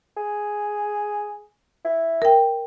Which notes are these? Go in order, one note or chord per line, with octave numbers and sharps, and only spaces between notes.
G#4
E4
A#4 G5